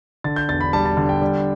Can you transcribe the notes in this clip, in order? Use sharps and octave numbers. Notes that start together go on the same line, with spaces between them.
D3 A6
G6
E1 A6
B5
G3 A5
A5
D3
G5
G3